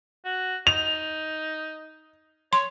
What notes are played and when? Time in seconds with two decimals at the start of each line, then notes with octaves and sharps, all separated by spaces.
0.25 F#4
0.67 D#4 F7
2.53 C#5 C6